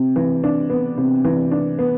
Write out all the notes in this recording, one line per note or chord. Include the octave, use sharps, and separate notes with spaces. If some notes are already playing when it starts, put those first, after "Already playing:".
Already playing: C3
E3
D4
B3
C3
E3
D4
B3